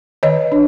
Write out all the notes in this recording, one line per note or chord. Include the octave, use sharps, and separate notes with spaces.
D#3 C#5 D#5
D4